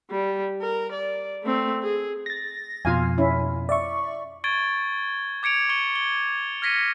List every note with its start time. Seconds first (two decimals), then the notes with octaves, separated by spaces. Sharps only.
0.11 G3
0.61 A#4
0.92 D5
1.44 A3 C4
1.83 G#4
2.26 A6 A#6
2.85 F2 B2 F4 F5 G#5
3.18 C#4 E4
3.69 D5 E5 C#6
4.44 C#6 G#6 A6 D7 G7
5.43 D6 G#6 C#7 D7 F7
5.69 C#6 C#7 G7
5.96 G7
6.62 F6 G#6 A#6 B6 C#7 D#7